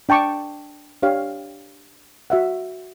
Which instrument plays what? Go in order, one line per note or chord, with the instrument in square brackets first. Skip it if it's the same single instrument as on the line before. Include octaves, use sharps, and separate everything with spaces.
[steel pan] D4 G5 A5 C#6 D6
D4 G4 C#5 F5
F#4 E5 F#5